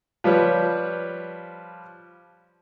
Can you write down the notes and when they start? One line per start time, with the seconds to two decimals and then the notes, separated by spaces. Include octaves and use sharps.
0.24 F3 G3 B4 C#5